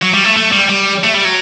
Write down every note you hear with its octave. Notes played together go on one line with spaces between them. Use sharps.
F#3
G3
A3
A3
G3
G3
A3
G3
F#3